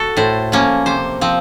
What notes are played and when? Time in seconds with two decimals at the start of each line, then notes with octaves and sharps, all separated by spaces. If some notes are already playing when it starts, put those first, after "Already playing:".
Already playing: F#4 A4
0.17 A2 C5
0.52 F3 A#3 C#4
0.86 C3 C5
1.21 F3 C4